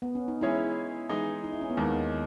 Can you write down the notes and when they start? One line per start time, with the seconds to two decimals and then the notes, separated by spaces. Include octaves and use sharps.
0.02 B3
0.15 C#4
0.28 D#4
0.41 E3 G#3 C#4 E4 G#4 C#5
1.09 E3 G#3 D#4
1.44 D#4
1.53 E4
1.61 C#4
1.70 B3
1.77 D#2 D#3 G#3 A#3